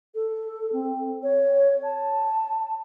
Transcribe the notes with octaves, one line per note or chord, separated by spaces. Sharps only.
A4
C4
C#5
A5